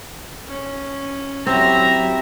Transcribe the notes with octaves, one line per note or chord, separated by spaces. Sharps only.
C#4
F#3 C4 E4 F#4 G4 E5 A#5